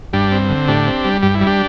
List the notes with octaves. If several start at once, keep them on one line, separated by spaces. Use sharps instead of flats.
G2 D4 G4
C4
D3
A2 D4 G4
C4
G3
G2 G4
E4
G3
D4 G4